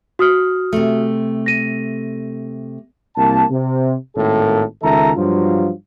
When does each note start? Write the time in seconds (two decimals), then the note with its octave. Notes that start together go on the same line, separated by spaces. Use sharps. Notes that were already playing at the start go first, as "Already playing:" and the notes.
0.19 F#4 D#6 F6
0.73 C3 A3
1.46 A#6 D#7
3.16 C2 A#3 A5
3.50 C3
4.16 G#1 A2 A#3 A4
4.82 C#2 D#3 A4 E5 A#5
5.16 G2 F3 F#3 F4